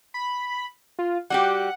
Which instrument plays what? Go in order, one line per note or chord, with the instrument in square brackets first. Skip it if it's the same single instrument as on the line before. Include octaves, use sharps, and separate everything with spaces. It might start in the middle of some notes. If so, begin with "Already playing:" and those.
[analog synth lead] B5
F4
[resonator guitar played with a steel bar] G3 F#4 G4 [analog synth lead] F#5